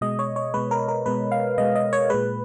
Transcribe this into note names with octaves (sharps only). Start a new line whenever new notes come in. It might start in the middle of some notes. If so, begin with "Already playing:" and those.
B2 G#3 D#5
C#5
C#5
B2 G#3 B4
A#4
A#4
B2 G#3 B4
F5
B2 G#3 D#5
D#5
C#5
A#2 G#3 B4